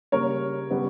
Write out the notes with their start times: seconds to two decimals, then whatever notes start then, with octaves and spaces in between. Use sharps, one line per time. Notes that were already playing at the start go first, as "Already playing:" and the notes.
0.12 C#3 G3 A#3 A#4 C#5
0.71 C#3 G3 B3